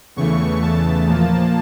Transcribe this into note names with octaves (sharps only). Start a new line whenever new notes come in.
E2 C#3 E3 A3 C#6
A5
A#2 F3 A#3